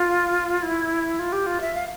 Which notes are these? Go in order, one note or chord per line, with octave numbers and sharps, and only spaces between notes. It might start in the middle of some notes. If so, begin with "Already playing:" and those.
Already playing: F4
E4
F4
G4
F4
E5
F5